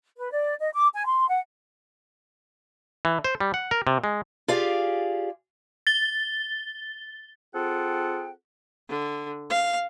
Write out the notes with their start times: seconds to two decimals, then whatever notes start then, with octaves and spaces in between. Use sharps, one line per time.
0.16 B4
0.32 D5
0.59 D#5
0.73 D6
0.94 G#5
1.06 C6
1.26 F#5
3.05 E3
3.24 C5
3.40 G3
3.54 F#5
3.71 A#4
3.87 C3
4.04 G#3
4.48 F4 G4 G#4 D5 F5
5.87 A6 G7
7.55 C4 F4 G#4 A4 F#5 G5
8.89 D3
9.50 F5